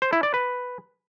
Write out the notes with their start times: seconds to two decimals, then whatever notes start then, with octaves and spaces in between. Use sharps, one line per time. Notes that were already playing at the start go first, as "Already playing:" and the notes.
0.02 C5
0.13 E4
0.23 D5
0.34 B4